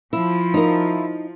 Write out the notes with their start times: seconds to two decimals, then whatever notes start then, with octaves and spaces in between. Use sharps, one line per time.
0.13 F3 E4
0.54 D#4 A#4